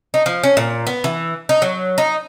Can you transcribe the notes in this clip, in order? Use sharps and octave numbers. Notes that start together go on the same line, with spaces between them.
D#4
F3
C#4
A#2
B3
E3
D#4
F#3
D#4